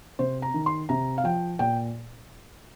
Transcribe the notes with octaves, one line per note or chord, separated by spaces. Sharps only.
C3 C5
A#5
D#3
C6
C3 A#5
F5
F3 G5
A#2 G5